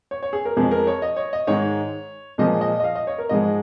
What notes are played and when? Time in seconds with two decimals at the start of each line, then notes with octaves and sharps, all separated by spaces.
0.11 C#5
0.23 C#5
0.33 G#4
0.45 A#4
0.57 F2 F3 G#3 G#4
0.71 A#4
0.87 C#5
1.02 D#5
1.17 C#5
1.33 D#5
1.47 G#2 D#3 G#3 C#5
2.38 A#2 F3 G#3 D#5
2.61 D#5
2.80 D#5
2.84 F5
2.95 D#5
3.07 C#5
3.18 A#4
3.29 G#2 F3 G#3 D#5